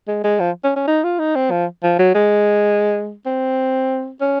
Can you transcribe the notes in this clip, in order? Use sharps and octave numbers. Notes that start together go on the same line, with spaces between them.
G#3
G#3
F3
C#4
C#4
D#4
F4
D#4
C4
F3
F3
F#3
G#3
C4
C#4